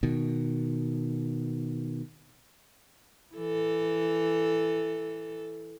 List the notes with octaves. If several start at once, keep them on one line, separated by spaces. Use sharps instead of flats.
B2 D#3
E3 A4